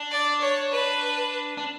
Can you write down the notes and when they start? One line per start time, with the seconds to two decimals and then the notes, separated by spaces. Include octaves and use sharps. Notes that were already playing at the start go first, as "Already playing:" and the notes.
Already playing: D4
0.11 D5
0.41 C#5
0.71 B4
1.57 D4